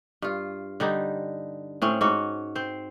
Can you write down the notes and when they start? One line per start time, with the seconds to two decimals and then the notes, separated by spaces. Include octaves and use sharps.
0.22 G2 F4
0.80 D3 G3 D#4
1.82 A2 C4 C#4
2.01 G#2 C#4 F#4
2.55 C4 C5